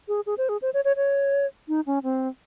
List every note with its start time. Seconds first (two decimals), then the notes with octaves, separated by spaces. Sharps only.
0.08 G#4
0.26 G#4
0.38 C5
0.49 G#4
0.62 C5
0.74 C#5
0.85 C#5
0.97 C#5
1.68 D#4
1.86 C#4
2.03 C4